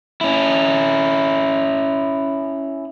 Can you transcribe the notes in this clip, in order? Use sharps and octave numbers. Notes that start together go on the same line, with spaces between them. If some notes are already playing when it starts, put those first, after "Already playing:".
C#4 E4